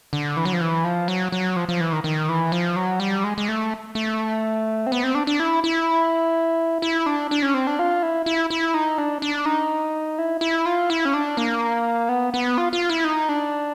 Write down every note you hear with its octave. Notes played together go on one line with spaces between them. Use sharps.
D3
E3
F#3
F3
E3
F3
F#3
F#3
F3
F3
E3
D#3
D#3
E3
F3
F#3
G3
G#3
G#3
A3
A3
C4
B3
C4
D4
D4
E4
E4
E4
D4
D4
C#4
C4
D4
F4
E4
E4
E4
D#4
D4
D4
D#4
E4
E4
F4
E4
C#4
D4
A#3
B3
B3
F4
F4
E4
D#4
D4